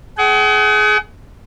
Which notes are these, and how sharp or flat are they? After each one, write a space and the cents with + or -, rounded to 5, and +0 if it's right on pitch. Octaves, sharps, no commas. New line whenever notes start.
G#4 +25 F#5 +45